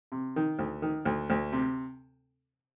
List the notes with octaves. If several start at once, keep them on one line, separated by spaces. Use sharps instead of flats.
C3
D#3
D2
D#3
D2
D2
C3